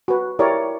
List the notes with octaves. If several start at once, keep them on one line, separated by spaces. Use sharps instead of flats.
F#4 B4
E4 G4 A#4 C#5 D5